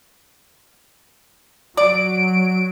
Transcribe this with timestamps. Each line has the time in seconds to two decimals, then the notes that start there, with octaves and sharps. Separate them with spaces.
1.77 F#3 D5 D7